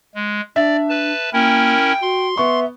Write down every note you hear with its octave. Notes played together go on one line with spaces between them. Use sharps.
G#3
D4 D5 E5
B4 A5
A#3 C#4 E4 A#4 G5
F#4 C6
B3 E5 C#6